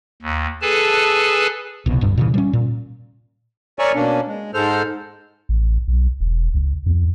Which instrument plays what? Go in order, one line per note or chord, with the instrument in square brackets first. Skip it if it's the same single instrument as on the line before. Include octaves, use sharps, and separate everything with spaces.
[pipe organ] D#2
G#4 A4 B4 G#5 A5
[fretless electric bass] D1 C2 B2
D1 G2
A#2 C#3 E3
G3 C#4
A#2
[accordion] A#4 C#5 D5 E5 G#5 C#6
B2 A#3 C#4 D4
G#3
G#2 G#3 A4 C5 F6
[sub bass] A1
B1
E1
C#2
F2